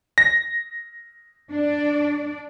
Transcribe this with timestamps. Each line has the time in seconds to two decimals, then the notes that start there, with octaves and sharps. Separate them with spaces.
0.18 A#6
1.51 D4 D5